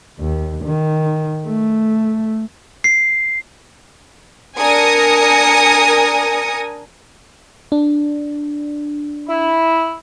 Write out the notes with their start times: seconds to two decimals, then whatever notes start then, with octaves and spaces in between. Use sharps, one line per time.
0.20 D#2
0.64 D#3
1.47 A3
2.84 C7
4.58 D4 A#4 G#5 D#6 A#6 C#7
7.72 D4
9.29 E4